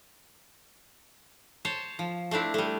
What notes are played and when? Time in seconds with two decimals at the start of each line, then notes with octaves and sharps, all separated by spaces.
1.65 C5 C#5 A5
1.99 F3
2.31 A3 C4 D4 E4
2.54 G3 A3